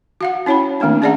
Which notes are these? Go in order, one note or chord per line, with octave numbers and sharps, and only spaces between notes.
F#4 F5 F#5
C#4 E4 C#5 G5 B5
D#3 A3 A#3 C4 D4
C#4 G#4 D5 E5 F#5 A#5